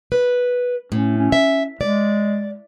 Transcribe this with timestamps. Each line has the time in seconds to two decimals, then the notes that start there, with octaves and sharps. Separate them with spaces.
0.12 B4
0.92 A2 C#4
1.18 C#4
1.32 E5
1.81 G#3 D5